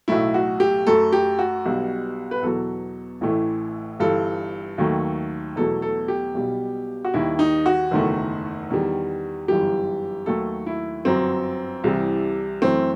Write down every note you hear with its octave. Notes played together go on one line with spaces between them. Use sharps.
B1 A2 F#3 A3 E4
F#4
G4
F#2 F#3 A3 A4
G4
F#4
B1 B2 G3
B4
E2 B2 F#3 A4
A1 A2 E3 A3
G1 G2 E3 G3 A4
D#2 D#3 F#3 A3
E2 B2 F#3 A3 A4
A4
G4
B1 B2 G3
F#4
D#2 D#3 G3 E4
D#4
F#4
F#1 E2 D#3 A3
E2 D#3 G3
G1 F#2 E3 G3 G4
D#2 D#3 F#3 A3 A4
E4
G1 F#2 F#3 C4
C2 C3 E3 G3
F#2 E3 A3 C4